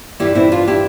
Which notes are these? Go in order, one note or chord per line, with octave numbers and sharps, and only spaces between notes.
G2 E3 G3 E4 G4
C4 E4
D4 F4
E4 G4